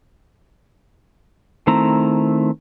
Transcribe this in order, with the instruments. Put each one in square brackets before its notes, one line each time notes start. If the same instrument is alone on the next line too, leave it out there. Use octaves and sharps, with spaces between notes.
[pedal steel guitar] D#3 A3 C4 E4 A#5